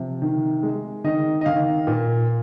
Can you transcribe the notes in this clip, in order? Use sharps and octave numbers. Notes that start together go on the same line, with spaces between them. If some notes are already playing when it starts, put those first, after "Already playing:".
Already playing: C3 F3
D#3
G#3
D#3 D#5
D#5
D#3 F5
A#2